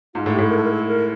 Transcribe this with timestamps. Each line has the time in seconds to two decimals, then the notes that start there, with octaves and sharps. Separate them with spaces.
0.14 G#2 F4
0.24 A2 E4
0.33 G4
0.38 A2 A4
0.49 A#4
0.57 A4
0.64 A#4
0.71 A4
0.87 A#4